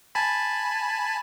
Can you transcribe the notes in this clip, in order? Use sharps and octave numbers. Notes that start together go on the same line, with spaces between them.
G#5 A5 B5